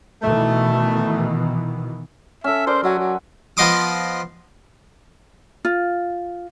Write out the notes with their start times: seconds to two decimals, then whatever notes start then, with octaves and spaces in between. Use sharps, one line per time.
0.22 B2 D#3 E3 A3
2.44 C#4 A4 E5
2.67 A#4 C5 D5 C6
2.84 F#3 E5 F#5 G#5
2.99 F#3
3.57 F3 B3 D#5 C6 D6 D#6
5.65 F4